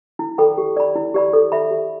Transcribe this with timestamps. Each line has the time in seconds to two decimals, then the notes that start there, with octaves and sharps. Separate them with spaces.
0.19 E4
0.38 A4 D5 G5 B5
0.58 G4
0.77 D5 B5
0.95 E4
1.14 G4 D5 B5
1.33 A4
1.52 E5 B5
1.71 G4